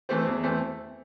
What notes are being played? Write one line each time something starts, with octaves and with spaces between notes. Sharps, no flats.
E3 A3 C4
E2
E3 A3 C4